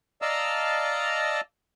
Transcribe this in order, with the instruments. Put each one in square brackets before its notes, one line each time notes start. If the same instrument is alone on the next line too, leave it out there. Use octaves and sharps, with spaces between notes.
[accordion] D5 D#5 F5 A5 A#5 E6